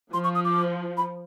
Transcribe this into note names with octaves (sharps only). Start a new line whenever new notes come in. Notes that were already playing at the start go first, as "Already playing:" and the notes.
F3 C6
C#6
D#6
D6
B5